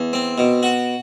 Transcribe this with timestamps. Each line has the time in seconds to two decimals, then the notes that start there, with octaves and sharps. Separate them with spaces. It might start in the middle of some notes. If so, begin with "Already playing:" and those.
Already playing: E2
0.13 C4
0.38 B2
0.63 F#4